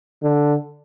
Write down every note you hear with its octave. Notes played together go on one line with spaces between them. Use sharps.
D3